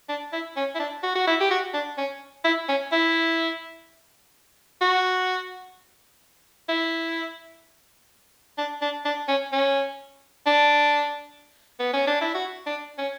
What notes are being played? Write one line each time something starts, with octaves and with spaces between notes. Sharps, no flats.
D4
E4
C#4
E4
D4
F#4
F#4
E4
G4
F#4
D4
C#4
E4
C#4
E4
F#4
E4
D4
D4
D4
C#4
C#4
D4
B3
C#4
D4
E4
F#4
D4
C#4